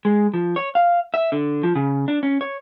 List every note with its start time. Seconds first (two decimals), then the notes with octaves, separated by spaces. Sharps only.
0.05 G#3
0.34 F3
0.56 C#5
0.75 F5
1.14 E5
1.32 D3
1.63 F3
1.75 C#3
2.08 D4
2.23 C#4
2.41 C#5